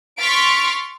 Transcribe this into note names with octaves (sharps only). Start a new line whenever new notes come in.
C6 C#6 F6 A6 B6 D7